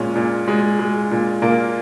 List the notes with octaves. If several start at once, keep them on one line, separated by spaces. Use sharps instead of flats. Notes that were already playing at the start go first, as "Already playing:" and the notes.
Already playing: A#2 G#3 C#4
A#2
G#3
G#3
A#2
A#2 A#3